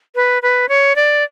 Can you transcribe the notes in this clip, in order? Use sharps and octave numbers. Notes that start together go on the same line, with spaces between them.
B4
B4
C#5
D5